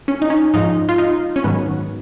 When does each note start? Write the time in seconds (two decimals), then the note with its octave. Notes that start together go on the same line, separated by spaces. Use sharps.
0.08 C#4
0.22 D#4
0.30 C#4
0.54 G#2 F3 G#3 D#4
0.89 F4
0.98 D#4
1.36 C#4
1.44 G#2 D#3 F#3 B3